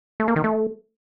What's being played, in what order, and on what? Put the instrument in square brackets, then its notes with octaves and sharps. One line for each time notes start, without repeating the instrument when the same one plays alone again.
[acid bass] A3
A#3
D#3
A3